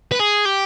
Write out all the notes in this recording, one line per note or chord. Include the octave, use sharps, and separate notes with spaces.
B4
G#4
G4